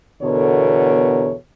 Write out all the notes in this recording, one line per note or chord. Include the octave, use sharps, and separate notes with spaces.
E2 B2 D3 A4 A#4 C#5